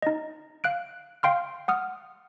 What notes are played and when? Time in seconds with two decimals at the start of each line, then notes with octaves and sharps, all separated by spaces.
0.02 D#4 D#5
0.64 F5 F#6 D7
1.23 F5 G5 C6 F6
1.68 F#5 D#6 F6